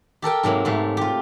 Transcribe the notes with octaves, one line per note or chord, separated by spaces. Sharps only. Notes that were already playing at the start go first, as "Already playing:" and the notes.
G4 A4 A#4 G5
G#2 C3 F#3 A#3
G#2 C3 A3
F4 G4